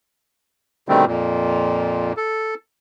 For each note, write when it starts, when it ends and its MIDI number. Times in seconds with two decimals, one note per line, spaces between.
0.89 1.05 47
0.89 1.05 50
0.89 1.05 51
0.89 1.05 55
0.89 1.05 57
0.89 1.05 60
1.07 2.13 41
1.07 2.13 46
2.17 2.54 69